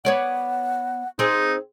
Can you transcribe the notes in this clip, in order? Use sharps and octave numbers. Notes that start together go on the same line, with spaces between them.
B3 C#5 D5 F#5
C4 D#4 G#4